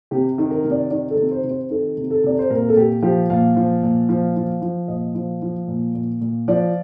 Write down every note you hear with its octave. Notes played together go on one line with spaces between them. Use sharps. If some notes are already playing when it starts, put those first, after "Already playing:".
C3 G4
D#3
A#4
C3
D5
D#3 D5
A4
C3
C5
C3
C5
D#3 A4
C3
A4
C3 D5
C5
A#2 A#4
A4
A#2 G4
F3 G4
A#2 F5
F3
A#2
F3
F3
F3
A#2 D#5
F3
F3
A#2
A#2
A#2
F3 D5